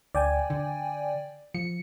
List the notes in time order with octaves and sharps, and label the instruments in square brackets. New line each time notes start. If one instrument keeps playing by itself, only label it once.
[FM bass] D2 [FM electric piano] D5 G5 G#5
[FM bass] D3
[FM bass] F3 [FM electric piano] C#7